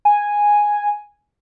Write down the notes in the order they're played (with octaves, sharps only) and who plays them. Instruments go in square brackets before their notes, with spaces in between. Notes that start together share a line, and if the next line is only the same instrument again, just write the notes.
[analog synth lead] G#5